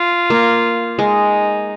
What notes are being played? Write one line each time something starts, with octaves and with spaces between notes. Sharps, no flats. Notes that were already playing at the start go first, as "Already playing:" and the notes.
Already playing: F4
A#3
G#3 D#4